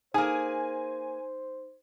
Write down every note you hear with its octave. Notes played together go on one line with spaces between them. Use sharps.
A#3 D#4 G#4 C5 G#5